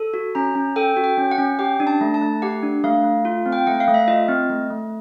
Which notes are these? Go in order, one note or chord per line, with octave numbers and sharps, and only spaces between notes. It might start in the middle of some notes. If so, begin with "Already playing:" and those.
Already playing: A4
F#4
C#4 A#5
C#4
A4 G5
F#4
G5
C#4
F#5
C#4
G4 G5
D4
A5
A3
A5
A3
G4 F#5
D4
A3 F5
A3
F4
C4
G5
A3 F#5
F5
A3
E5
F4 D#5
C4
A3
A3